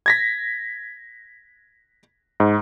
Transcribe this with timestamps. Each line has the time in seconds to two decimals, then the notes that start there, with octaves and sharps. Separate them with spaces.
0.06 G#6 A#6 B6
2.40 G#2